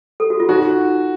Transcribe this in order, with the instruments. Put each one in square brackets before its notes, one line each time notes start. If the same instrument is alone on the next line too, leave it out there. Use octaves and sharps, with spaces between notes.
[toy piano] A4
F#4
F4
[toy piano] D#4 [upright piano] F#4